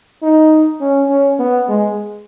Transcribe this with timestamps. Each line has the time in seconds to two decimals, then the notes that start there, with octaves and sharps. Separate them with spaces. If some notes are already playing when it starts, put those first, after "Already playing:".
0.23 D#4
0.81 C#4
1.10 C#4
1.39 B3
1.69 G#3